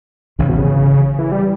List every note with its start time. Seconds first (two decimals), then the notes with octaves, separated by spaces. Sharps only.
0.39 G#1 G#2 C#3 E3
0.49 B2
0.58 C#3
1.19 E3
1.32 G3